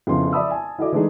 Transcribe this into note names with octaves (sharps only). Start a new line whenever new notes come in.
F2 C#3 B3 E4 C6
D5 E5 A5 B5 D#6 E6
G#5 A5
E4 F#4 A4 D5 D#5 D6
E3 G#3 A3 D4 D#4 G#4